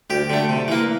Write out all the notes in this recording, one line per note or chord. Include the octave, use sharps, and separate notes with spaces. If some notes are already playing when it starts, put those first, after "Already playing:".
D2 G4
D3 A3
C3
E3 A#3